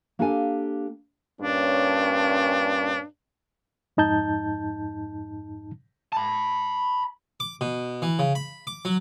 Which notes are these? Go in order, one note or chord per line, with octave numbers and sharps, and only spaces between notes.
A#3 D4 G4 A4 F5 G#5
G2 A#2 C#4 D4
F2 G#2 D#4 A5 G6
A5 B5
D6
B2
E3
C#3
B5
D6
F#3